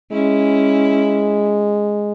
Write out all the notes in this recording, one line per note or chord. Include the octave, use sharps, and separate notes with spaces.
G#3 C#4 E4